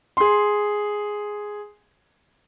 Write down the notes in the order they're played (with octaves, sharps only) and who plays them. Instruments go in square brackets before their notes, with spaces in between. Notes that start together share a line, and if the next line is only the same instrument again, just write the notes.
[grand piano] G#4 C6